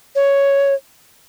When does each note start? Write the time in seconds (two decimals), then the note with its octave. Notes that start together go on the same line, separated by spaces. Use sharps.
0.15 C#5